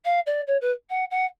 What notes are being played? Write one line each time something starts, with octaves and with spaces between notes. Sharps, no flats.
F5
D5
C#5
B4
F#5
F#5